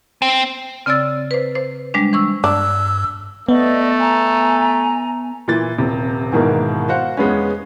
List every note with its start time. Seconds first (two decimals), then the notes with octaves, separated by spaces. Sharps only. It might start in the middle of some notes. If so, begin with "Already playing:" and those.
0.22 C4
0.86 C#3 C4 D5 E6 A6
1.31 B4 C5
1.55 C5
1.94 G3 G#3 D4
2.13 E3 C#6 E6
2.44 G2 D4 E6
3.49 A3 B3 D5 D#5
3.99 G#5 A#5
5.48 A#2 E3 A6
5.78 D#1 C3
6.33 G#2 B2 D#3 E3 A#3
6.89 F#4 C5 F5 F#5
7.17 E2 G#3 B3 C#4